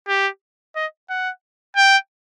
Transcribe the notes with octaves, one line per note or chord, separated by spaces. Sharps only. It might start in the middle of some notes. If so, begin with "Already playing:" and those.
G4
D#5
F#5
G5